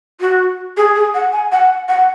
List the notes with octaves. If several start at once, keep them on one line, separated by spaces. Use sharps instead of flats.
F#4
G#4
G#4
F#5
G#5
F#5
F#5